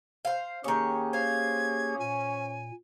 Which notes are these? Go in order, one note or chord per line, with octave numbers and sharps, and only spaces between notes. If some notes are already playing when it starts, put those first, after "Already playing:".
C5 F5
D#3 A#3 C#4 G4 G#4 C#5
C5 F5 G#6
A#2 G#5